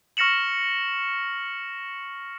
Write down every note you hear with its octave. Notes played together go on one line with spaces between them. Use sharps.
C#6 F6 A#6 C#7 E7 F#7